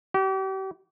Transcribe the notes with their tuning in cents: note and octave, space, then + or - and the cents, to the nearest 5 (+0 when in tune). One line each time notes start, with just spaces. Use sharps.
G4 -40